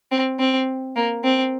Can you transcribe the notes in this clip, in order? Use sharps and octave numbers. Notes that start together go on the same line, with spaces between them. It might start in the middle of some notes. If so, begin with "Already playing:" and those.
C4
C4
A#3
C4